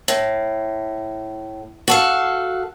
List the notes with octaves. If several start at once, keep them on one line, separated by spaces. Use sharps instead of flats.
A2
F#4 A4 F5